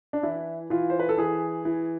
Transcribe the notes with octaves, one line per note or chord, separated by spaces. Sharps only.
D4
E3 E4
E3 F4
C5
B4
A4
E3 G#4
E3